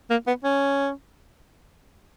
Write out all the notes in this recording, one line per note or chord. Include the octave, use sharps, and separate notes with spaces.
A#3
B3
C#4